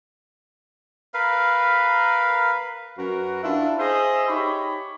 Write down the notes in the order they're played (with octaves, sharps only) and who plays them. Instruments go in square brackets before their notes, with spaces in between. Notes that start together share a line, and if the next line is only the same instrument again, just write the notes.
[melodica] A#4 B4 F5
[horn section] F#2 F#4 A#4 B4
D4 E4 F4
G#4 C5 D#5 E5
D#4 G4 C#5 B5